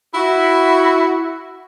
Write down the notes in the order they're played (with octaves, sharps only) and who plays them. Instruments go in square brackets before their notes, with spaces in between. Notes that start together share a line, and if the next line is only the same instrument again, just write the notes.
[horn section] E4 F#4